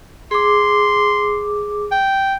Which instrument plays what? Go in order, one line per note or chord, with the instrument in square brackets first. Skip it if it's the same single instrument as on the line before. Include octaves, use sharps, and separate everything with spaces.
[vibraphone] G#4 D6 [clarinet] C6
[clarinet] G5